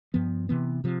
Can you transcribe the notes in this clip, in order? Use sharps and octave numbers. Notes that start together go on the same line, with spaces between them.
G2 F3 B3
C3 E3 B3
C3 F3